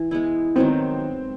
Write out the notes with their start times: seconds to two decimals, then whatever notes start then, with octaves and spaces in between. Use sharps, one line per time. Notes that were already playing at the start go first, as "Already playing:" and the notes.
Already playing: E3
0.11 G#3 B3 E4
0.56 D#3 F#3 B3 C4